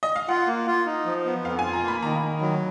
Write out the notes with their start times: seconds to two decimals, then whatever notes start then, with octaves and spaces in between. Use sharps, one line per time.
0.03 D#5
0.16 F5
0.29 F4 F#5
0.47 A#3
0.67 F4
0.86 D#4
1.06 F3
1.26 B3
1.45 F2 F5
1.59 G#5
1.64 F4
1.73 A#5
1.83 A#3 B5
2.03 D#3 A#5
2.22 D#3
2.41 F#3